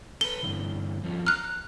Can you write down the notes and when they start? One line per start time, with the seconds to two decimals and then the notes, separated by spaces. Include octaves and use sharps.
0.21 A4 B4 G7
0.43 G2 D3 E3
1.04 F3 C#4 A4
1.27 A#5 F6 F#6